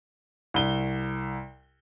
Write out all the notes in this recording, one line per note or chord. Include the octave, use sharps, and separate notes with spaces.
C2 G7